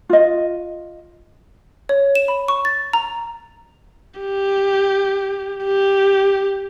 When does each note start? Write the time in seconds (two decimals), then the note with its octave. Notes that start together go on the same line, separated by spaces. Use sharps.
0.09 F4 D#5
1.89 C#5
2.15 E7
2.28 B5
2.48 C#6
2.65 A6
2.93 A#5
4.20 G4
5.64 G4